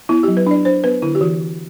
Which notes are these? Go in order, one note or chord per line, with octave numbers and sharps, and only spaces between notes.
B3 E4
G4
F#3
B4
D4 D5
D4 C5
B3 B4
D3 E4
G4
E3 F#4
E3